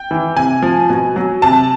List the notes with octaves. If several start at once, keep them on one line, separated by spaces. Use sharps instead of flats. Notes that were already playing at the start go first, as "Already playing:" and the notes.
Already playing: G5
E3
C3 G#5
F3
B2
F#3
C3 A5